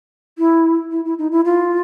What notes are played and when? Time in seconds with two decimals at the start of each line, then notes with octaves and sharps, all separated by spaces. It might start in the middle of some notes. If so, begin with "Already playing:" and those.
0.38 E4
0.92 E4
1.05 E4
1.19 D#4
1.32 E4
1.45 F4